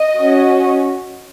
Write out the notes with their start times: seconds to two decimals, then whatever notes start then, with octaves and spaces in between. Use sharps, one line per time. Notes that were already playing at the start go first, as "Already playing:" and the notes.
Already playing: D#5
0.16 C#4 F#4